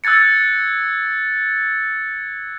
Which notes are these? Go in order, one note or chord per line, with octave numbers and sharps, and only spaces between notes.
E6 F#6 G#6 A6 C#7